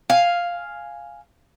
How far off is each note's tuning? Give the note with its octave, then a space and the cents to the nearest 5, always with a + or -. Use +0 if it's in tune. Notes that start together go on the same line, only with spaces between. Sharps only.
F5 +0 G#5 +0